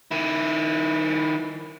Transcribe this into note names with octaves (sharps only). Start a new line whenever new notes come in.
D#3 E4